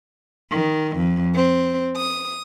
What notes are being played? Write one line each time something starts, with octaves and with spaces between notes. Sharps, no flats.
D#3
F2
C4
D#6